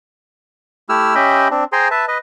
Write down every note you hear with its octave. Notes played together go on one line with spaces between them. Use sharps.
A3 E4 G4 E6 F6
C#4 G4 D#5 E5 G5 B5
C4 D4
G#4 C5 G5 G#5 A#5 C6
B4 E5 A5
B4 D#5